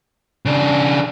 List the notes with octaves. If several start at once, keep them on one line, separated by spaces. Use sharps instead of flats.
C#3 D4